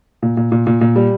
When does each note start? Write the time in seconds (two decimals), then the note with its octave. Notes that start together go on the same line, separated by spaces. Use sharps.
0.22 A#2
0.37 A#2
0.52 A#2
0.67 A#2
0.81 A#2
0.96 G3